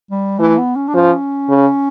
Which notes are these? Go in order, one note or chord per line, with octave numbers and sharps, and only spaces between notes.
G3
E3 A3
B3
C#4
D4
F3 C#4
C#3